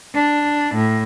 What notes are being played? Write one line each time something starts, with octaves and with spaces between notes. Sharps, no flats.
D4
A2